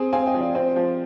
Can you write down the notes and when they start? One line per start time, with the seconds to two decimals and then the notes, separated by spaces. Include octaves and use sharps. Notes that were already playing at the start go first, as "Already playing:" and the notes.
Already playing: C4 G#4
0.12 C4 F5 G#5
0.26 D#5 G5
0.34 F3
0.41 D5 F5
0.54 C4 C5 D#5
0.76 F3